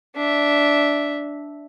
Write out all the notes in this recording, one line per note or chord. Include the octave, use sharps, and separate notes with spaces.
D4 E5